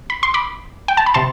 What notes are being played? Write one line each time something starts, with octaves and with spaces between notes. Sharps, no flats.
B5
C6
B5 D6
G5
A5
B5
C3 A5 C6